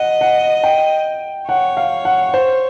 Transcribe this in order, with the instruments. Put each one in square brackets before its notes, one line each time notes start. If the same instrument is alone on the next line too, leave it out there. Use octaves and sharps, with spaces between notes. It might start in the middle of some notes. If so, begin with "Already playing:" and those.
Already playing: [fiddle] D#5 [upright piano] F#5
[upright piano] F#5
G5
[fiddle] C#5 [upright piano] F#5
[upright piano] F5
F#5
C5